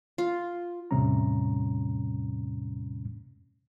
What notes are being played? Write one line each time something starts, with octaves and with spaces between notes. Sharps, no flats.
F4
E2 A2 C3 G3 C#4 A#5